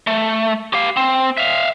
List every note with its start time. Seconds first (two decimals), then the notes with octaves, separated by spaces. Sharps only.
0.07 A3
0.73 G4 F5
0.97 C4
1.37 E5 F5